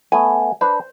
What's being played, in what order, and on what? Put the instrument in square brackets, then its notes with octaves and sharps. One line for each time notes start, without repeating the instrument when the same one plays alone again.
[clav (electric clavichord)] A3 B3 [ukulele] G#5
[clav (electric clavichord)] D4 B4 [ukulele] C5